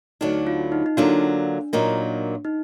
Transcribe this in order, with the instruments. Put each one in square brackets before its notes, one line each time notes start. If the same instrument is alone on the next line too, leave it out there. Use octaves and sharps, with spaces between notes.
[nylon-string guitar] D2 D3 F#3 D4 [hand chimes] D#4
[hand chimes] F4
D#4
D#4
[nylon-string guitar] D3 F#3 A#3 F4 [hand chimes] D4
[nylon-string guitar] A#2 F#3 A#3 D#4
[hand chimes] D#4